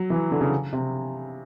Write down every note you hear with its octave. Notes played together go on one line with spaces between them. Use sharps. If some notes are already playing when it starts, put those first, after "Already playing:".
Already playing: F#3
E3
D3
C#3
C3